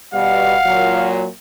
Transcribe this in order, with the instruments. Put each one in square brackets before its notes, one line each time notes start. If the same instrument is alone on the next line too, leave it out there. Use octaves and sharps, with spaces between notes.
[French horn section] B2 G3 [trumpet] F5 [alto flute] F#5
[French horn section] A#2 F#3